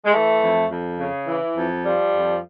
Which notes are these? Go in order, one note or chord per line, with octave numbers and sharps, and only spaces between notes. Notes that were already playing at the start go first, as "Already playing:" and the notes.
G#3
E3 A3
F2
F2
C#3
E3
F2
F3 G3
F2